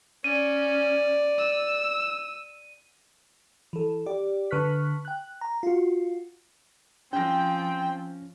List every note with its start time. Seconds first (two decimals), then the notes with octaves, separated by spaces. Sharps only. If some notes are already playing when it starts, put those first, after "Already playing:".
0.24 C#4 D5 D#7
1.38 E6
3.73 E3 A4
4.06 G4 D5
4.51 D3 B4 C#6 F6 F#6 B6
5.05 G5 F#6
5.41 A#5
5.63 F4 F#4
7.13 F3 C4 C#4 G5 A#6